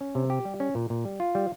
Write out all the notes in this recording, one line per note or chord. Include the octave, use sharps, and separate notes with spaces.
C#4
C3
G4
G3
C#4
A#2
A#2
G3
F4
G3